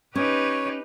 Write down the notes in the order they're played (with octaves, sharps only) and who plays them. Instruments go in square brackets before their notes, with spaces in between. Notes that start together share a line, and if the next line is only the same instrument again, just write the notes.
[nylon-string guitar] C#4 [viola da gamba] D#4 G4 B4 [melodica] C#5